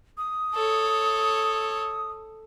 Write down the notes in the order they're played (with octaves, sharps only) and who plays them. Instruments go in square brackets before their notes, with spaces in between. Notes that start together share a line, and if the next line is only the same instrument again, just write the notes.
[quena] D#6
[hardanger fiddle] A4 C#5